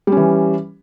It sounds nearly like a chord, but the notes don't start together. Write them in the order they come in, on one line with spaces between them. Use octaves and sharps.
G3 C#4 E3